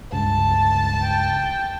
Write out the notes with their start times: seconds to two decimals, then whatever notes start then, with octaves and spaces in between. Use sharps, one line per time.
0.13 C#2 G2 A5
1.01 G5